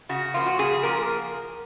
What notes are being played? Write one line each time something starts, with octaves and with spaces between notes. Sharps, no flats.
C#3 F#4
F3 A#3 F4
F#4
C#3 G#4
F3 A#3 A#4